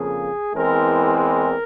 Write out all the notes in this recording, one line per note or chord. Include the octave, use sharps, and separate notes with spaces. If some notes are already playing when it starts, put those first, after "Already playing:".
Already playing: F2 C#3 F3 A#3 G#4
E2 E3 G#3 C4 A#4
A#4